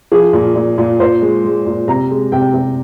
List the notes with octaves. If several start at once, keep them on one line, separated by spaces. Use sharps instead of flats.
F3 G#4
A#2
A#2
A#2
A#2 C5
G#3
G#3
A#2
C3 A#5
G#3
C3 G5
C3